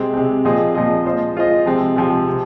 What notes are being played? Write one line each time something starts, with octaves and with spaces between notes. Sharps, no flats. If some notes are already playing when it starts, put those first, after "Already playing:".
Already playing: C3 G#3 C4
C3 G#3 C4
A#2 F3 C4 G#4 D#5
A#2 F3 C4 G#4 D#5
G#3 F4 C5 D#5
G#3 F4 C5 D#5
C3 F3 G#3 C4
C3 F3 G#3 C4
C3